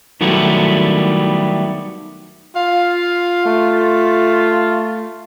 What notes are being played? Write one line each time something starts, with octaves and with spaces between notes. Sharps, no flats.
D#3 F#3 G3 A3 B3 E4
F4 F5
A3